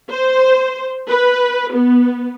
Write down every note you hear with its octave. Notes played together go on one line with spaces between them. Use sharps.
C5
B4
B3